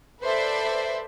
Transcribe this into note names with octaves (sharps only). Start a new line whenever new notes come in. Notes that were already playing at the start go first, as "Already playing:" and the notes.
A4 B4 C5 D5 E5